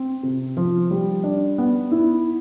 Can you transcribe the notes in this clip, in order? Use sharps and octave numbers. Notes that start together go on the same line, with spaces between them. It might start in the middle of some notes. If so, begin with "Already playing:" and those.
Already playing: C4
C3
F3
G3
D4
B3
E4